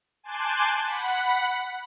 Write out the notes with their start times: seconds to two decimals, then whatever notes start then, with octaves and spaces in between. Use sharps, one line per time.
0.23 G#5 A5 C6 D6 F#6 G6
0.83 F#5 B5